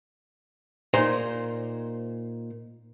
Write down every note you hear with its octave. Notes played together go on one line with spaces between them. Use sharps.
A#2 D#4 C5